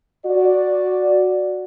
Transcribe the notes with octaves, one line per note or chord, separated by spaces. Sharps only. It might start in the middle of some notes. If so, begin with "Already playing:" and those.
F#4 D5